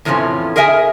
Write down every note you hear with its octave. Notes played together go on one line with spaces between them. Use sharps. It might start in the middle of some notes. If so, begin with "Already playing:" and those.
E2 A2 C3 F3 C#4
G#4 A#4 D#5 E5 G#5